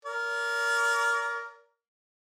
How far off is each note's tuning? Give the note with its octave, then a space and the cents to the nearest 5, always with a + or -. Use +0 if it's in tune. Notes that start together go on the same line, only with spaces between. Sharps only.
A#4 +0 D5 -45